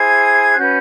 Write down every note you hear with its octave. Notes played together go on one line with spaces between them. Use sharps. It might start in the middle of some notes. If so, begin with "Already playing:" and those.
Already playing: E4 G#4 C5 G#6
F#6
C#4 F#4 B4 G6